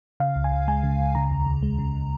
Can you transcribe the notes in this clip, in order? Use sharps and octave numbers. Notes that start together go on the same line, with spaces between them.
C#3 F5
C#2
G#5
C#2
G#3 G#5
C#3
C#2
C#3 A#5
D#2
D#2
G#3
C#3